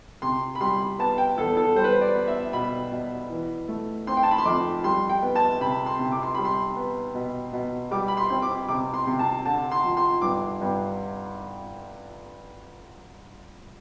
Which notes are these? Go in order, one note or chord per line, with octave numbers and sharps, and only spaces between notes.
C3 C6
B5
G3 C6
B3 A5
G5
E2 A4
A4
G3 C5
B4
C5
D5
B3
E5
B2 B5
B2
E3
A3
C4 C6
G5
A5
B5
C6
F2 D6
G3 C6
G5
B3
A5
C3 B5
C6
C3
D6
C6
G3 B5
C6
B3
B2
B2
G3 D6
B5
C6
C4
D6
C3 D6
C6
C3
A5
D3 A5
C6
F3
C6
G2 D6
G2